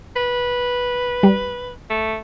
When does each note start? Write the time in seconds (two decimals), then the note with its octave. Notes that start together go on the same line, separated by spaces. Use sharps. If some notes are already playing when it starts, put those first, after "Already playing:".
0.16 B4
1.23 G3
1.90 A3